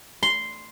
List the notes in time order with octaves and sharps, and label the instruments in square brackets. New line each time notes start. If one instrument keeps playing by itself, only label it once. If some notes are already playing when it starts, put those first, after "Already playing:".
[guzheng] C6